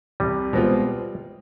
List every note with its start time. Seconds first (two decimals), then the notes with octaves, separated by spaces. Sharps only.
0.20 C2 G3
0.53 B2 G#3 C4 F4